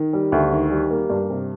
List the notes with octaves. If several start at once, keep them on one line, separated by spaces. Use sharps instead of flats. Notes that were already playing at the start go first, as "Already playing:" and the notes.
Already playing: D#3
G3
D2
D#3
G3
A#3
G2
C3